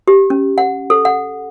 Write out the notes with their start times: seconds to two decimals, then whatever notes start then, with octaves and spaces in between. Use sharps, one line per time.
0.08 G4
0.30 C#4
0.58 F#5
0.90 A4
1.05 F#5